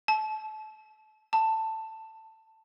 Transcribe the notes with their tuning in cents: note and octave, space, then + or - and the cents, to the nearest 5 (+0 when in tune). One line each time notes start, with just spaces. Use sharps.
A5 -30
A5 +10